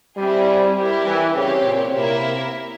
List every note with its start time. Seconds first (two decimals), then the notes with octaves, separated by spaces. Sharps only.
0.17 G3 C4 E4 G#4
0.76 G3 E4 G4 A#4
1.06 E3
1.35 C#3 C4 G4 C#5
1.64 A#2
1.93 C3 A#3 E4 A#4 E5